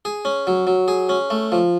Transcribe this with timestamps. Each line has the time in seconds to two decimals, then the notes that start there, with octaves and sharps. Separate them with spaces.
0.05 G#4
0.25 C#4
0.47 F#3
0.67 F#3
0.88 G#4
1.09 C#4
1.30 A3
1.52 F3